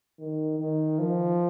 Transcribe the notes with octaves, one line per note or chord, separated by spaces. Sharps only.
D#3
D#3
F3